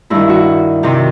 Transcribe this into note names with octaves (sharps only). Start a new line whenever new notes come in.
G2 D#3 E4
F#4
C3 D#3 G4